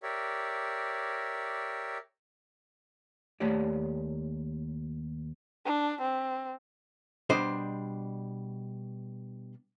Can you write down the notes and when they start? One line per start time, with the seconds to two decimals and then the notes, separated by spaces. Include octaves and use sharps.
0.03 G4 A#4 C#5 D5 E5
3.40 D#2 A3 G4 C#5 D5
5.66 D4
6.01 C4
7.30 B2 G3 D4 C5 D#5